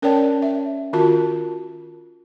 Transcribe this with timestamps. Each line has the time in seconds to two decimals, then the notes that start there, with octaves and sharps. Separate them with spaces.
0.02 C#4 A#4 C#5 D5 G5 A5
0.42 E5
0.93 D#3 F4 F#4 A#4 A5